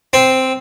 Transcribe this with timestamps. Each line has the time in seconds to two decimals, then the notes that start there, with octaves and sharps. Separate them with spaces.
0.13 C4